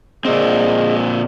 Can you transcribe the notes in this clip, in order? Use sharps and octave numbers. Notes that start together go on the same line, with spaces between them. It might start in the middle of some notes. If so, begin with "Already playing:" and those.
A#2 C4 G#4 D#5